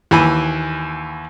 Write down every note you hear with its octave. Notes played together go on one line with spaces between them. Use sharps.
D#2 E3 G#5 B5